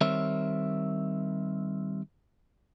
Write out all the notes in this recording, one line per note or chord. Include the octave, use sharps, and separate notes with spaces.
D#3 G3 C4 A#4 C#5 E5